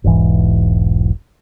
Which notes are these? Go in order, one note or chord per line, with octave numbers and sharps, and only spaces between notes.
E1 B1 G#2 E3